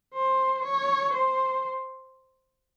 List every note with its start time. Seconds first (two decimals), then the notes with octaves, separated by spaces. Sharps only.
0.14 C5
0.64 C#5
1.13 C5